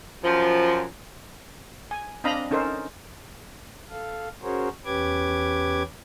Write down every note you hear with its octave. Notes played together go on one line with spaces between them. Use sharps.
F#2 F3
G#5
C4 D4 D#5 F5 A#5 B5
C#4 D#4 A4 A#4 C5
A4 F5
C#4 F#4 G#4 A#4 C5 C#5
E2 C#4 G4 B4 D6 G#6